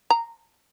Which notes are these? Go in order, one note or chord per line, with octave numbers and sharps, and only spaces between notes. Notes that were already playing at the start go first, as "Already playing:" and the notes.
A#5